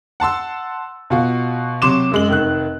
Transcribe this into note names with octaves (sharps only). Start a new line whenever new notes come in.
F#5 A5 C6 E6
B2 F4 F#4
C3 F#3 C6 D6 E7
F#2 G#3 F#7
F1 D#3 F#6